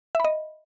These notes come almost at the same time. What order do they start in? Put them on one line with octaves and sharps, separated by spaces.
E5 B5 D#5